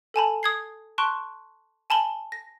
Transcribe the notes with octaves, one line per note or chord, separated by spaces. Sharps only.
A4 G#5 A5 B5
D#6 G#6 C7
A5 C6 C#6 F#6 D7
G#5 A5 B5 G7
A#6